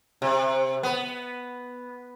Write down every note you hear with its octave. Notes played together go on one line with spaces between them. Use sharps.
C3
B3